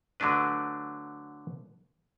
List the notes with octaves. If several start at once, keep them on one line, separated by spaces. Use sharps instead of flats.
D3 F#3 A3 D4 B4